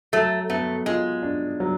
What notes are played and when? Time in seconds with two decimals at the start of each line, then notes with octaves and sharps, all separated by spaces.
0.13 F#3 A3
0.49 A3 B3
0.86 G#3 F4
1.23 D4
1.60 F#3